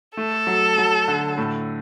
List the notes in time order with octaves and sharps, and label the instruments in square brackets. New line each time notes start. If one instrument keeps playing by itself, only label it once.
[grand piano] A3 [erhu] A4
[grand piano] F#3
F#3
D3
A2